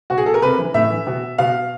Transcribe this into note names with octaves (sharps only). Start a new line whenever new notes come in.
B2 F#4
G#4
A4
A#4
C3 B4
E3
A2 E5
E3
B2
B2 F5